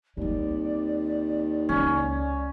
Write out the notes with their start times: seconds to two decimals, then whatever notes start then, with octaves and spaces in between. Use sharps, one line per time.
0.17 D#2 G3 C4 D5
1.69 C#2 G#3 C#4